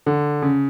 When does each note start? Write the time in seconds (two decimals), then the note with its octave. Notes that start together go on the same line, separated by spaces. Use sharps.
0.06 D3
0.42 C#3